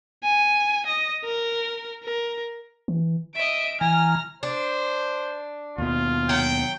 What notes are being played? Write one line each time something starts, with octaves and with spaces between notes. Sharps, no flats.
G#5
D#5
A#4
A#4
E3
D#5 E5 D7
E3 G#5 A#5 F6 A#6
D4 C5
D#2 B2 F4
F#3 G5